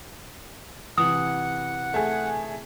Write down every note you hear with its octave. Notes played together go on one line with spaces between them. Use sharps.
C3 E3 F#5 D#6
A3 G#4